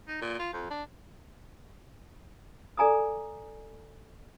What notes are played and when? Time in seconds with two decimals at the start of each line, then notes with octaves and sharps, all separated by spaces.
0.08 D#4
0.21 A#2
0.39 F4
0.53 F2
0.70 D4
2.77 A4 D5 G#5 A#5 D6 D#6